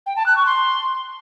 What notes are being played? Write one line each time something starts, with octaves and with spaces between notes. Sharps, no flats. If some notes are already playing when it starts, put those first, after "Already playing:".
G5
A5
F#6
C#6
C6